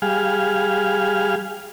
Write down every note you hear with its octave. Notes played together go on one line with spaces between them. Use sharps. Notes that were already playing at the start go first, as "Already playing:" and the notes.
G3 G#4 F5